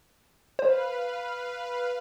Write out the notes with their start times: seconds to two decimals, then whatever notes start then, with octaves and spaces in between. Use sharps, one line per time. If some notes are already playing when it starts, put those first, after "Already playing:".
0.59 B4 C5 F5